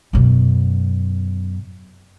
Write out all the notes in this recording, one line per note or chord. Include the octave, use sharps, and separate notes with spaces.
F#2 B2